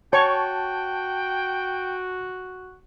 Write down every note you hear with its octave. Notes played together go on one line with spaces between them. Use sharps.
F#4 C#5 G5 A5 C#6